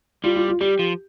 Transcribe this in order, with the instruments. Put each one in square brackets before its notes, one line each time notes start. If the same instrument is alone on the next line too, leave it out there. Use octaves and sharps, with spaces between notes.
[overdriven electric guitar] G3 [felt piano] F4
[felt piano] F4
F4
[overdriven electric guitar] G3 [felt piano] G4
[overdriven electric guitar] F3